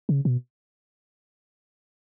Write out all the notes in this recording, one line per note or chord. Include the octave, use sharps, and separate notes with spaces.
C#3
B2